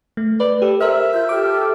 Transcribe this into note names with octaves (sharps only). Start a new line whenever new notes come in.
A3
B4 D5
G4 A4
A#4 C5 E5 F6
F4 G6
G4 A4 D6 F6